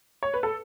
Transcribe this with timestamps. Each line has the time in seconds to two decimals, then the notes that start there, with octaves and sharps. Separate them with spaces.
0.23 C#5
0.34 B4
0.43 A4